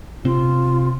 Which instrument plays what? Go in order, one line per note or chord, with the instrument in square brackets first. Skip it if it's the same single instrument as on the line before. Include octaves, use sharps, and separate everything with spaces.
[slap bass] C3 C4 [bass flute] F4